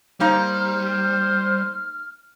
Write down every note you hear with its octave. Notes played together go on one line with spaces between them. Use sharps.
G3 A#3 D#4 C5 A#5 F6